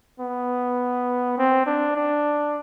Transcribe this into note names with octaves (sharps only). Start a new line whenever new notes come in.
B3
C4
D4
D4